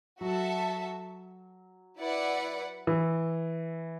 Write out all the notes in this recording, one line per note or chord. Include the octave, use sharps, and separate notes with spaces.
F#3 F#4 A4 E5 A5
E4 B4 D5 F#5
E3